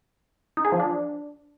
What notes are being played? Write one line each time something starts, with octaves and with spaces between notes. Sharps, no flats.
D#4
G#4
F3
D4